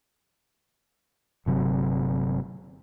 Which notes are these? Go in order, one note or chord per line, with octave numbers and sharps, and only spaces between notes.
G1 C3 F#3